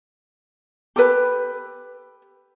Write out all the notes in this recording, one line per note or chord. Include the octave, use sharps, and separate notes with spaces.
G4 A4 B4 B5